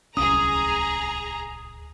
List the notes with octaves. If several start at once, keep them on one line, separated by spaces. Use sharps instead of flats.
D1 C2 C#4 G#4 A#5 D#6